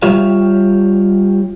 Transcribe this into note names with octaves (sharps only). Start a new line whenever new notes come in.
G3 F4 G4 C#5 E5 F5